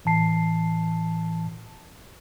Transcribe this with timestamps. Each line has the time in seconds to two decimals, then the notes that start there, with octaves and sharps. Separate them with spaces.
0.05 A2 E3 A5 C7